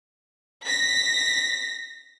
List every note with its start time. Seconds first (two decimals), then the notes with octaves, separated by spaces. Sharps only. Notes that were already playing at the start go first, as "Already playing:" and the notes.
0.66 A#6 B6